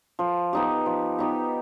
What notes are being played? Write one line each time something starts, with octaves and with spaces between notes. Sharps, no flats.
F3
B3 D#4 G4
F3
B3 D#4 G4